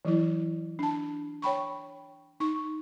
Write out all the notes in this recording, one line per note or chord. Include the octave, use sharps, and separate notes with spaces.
E3 F#3 E4
D4 A5
C#5 G5 B5 C#6
D#4 C#6